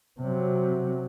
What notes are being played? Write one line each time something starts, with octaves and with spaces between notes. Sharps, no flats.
C3 F#3